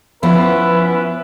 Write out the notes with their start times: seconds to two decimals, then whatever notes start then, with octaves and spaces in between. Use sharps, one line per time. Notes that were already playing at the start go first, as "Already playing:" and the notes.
0.23 F3 B3 C#4 E4 B4